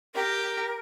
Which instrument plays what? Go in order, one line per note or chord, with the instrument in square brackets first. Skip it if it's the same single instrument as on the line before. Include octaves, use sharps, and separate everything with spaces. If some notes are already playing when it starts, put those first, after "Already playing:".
[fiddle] G4 [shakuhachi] A#4